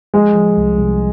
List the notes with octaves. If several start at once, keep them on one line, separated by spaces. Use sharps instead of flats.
F3 G#3
F3
C2
C2